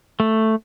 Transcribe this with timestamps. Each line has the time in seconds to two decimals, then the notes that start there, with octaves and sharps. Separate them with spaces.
0.20 A3